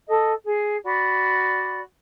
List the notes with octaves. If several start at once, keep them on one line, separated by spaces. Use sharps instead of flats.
A4 D#5
G#4
F#4 D5 B5